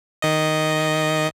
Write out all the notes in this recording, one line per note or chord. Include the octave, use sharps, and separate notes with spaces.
D#3 D#5